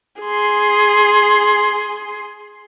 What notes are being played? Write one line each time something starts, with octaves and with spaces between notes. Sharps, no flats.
G#4 C6